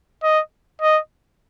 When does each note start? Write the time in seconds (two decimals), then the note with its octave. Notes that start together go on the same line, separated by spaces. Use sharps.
0.23 D#5
0.82 D#5